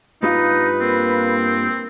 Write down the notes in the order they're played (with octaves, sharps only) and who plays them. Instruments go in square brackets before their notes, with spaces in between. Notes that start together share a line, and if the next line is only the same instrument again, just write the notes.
[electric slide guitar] G2 F4 F5 [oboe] D#4 [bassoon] B4
[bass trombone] A#3 [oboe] C4